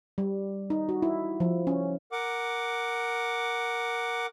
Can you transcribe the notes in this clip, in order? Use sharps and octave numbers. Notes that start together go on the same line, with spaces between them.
G3
D#4
F#4
E4
F3
C#4
A#4 F#5 D6